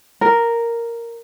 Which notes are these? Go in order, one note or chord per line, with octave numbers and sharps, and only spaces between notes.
A#4